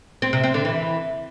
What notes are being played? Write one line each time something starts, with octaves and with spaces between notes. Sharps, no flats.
C4
C3
C4
D3
E3